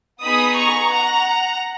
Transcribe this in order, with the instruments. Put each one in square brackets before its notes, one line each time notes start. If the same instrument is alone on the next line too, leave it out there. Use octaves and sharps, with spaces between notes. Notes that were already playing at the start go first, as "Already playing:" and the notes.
[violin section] B3 D#4 G#4 B5 D#6
A#5 C#6
F#5 A#5